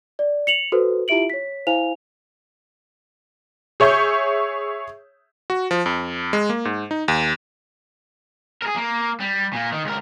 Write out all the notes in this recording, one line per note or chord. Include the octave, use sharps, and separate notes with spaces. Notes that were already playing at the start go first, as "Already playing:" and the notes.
D5
C#7 F7 F#7
F#4 A4 B4 C5
E4 F4 G4 E5 D7 F#7
C#5 B6
E4 C5 F5 G#5 F7
G#4 C#5 E5 C#6 G6
F#4
F3
F2
G#3
A#3
G#2
D#4
D#2
G#4 A#4
A#3
G3
A#2 A#3
D#3
C#2 A#4